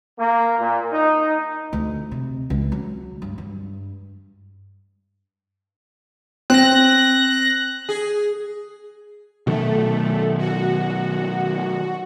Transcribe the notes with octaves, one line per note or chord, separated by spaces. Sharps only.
A#3
A#2
D#4
D2
C3
C#2
F#3
G2
G2
C4 F#6 A#6
G#4
B2 D#3 F#3 A3
F#4